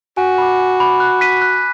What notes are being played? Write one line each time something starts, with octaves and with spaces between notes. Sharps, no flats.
F#4 G#5
B5 D6
G#5
B5 D6
F#6
B6 D#7
F#6